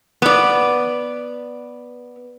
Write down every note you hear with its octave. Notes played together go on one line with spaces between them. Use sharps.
B3 D5